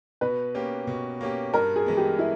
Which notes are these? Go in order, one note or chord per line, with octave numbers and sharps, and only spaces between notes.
B2 B4
A#3 C#4 G4
B2
A#3 C#4 G4
G2 A#4
G#4
E3 G#3 B3
G4
E4